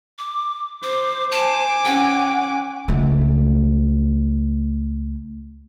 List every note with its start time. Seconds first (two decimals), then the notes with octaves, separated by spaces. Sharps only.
0.18 D6
0.83 C5 D6
1.32 C5 G#5 A5 D6
1.85 C#4 F#5 G5
2.88 C#2 A3